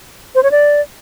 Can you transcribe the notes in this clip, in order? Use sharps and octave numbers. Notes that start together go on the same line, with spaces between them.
C5
C#5
D5